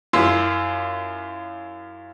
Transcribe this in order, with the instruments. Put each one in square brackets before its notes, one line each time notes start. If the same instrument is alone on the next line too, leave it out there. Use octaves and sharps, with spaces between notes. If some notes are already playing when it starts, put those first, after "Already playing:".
[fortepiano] F#2 E4 F4 C6 E6